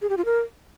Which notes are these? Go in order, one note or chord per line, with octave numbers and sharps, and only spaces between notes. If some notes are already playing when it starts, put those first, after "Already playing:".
G#4
G4
F4
A#4